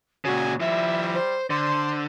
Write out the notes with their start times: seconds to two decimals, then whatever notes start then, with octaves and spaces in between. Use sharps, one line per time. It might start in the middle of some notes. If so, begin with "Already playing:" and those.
0.25 A#2 C#3 F#4 G#5
0.60 F3 G3 E4 E5
1.14 C5
1.50 D3 C5 C6